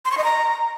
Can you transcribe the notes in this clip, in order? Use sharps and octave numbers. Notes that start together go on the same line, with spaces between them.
C6
C#6
D#5
A#5